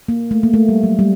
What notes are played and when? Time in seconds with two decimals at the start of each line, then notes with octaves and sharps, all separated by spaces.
0.08 A#3
0.31 A3
0.43 A#3
0.54 A3
0.69 G3
0.83 F#3
0.99 G3